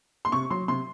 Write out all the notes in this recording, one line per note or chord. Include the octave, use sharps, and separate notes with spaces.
C6
C3 C#6
F#3 C6
C3 C6